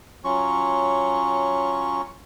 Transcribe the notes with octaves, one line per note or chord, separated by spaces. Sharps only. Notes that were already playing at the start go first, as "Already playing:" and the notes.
F#3 C#4 F4 C#6